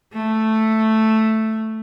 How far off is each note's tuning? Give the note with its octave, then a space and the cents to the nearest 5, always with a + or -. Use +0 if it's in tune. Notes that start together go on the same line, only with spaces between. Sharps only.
A3 +0